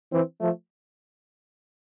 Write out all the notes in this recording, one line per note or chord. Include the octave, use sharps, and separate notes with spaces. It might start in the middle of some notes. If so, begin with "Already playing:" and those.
E3 C4
F3 A3